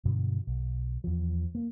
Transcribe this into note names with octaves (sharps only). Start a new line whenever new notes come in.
G2 B2 D3 F#3
B1
E2 F3
A#3